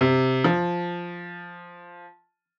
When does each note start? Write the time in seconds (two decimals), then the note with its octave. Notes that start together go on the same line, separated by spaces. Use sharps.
0.01 C3
0.44 F3